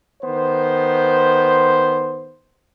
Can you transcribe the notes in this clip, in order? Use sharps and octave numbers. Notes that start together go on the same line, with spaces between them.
D#3 B3 C5